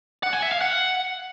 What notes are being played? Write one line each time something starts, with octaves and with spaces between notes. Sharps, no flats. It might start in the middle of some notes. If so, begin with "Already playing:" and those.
F#5
G#5
E5
F5
F#5